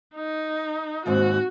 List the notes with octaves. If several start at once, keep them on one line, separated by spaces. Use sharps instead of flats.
D#4
D#2 G#2 C4 F#4